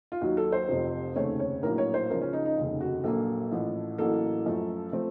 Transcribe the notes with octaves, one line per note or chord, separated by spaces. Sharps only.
F4
D#2 D#3 F#3 F#4
A4
C5
F1 F2 C3 F3 C4
F1 D#2 C#3 A3 C4 C#5
C#5
A#1 A2 F#3 A#3 A#4
C#5
C5
C#2 C#3 F3 A#4
C#4
D#4
D#4
F1 D#2 C#3
F#4
A#1 A#2 F#3 A#3 A4
A1 A2 F3
A1 A2 F#3 A#3 A4
F#2 F3 A3
F3 A3 C4